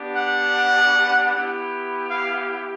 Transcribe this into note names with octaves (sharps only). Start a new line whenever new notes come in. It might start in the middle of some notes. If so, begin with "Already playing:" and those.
Already playing: B3 D4 G4
F#5
B3 E4 G4
F5